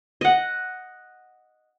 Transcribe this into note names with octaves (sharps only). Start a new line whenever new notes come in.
D#5 F#5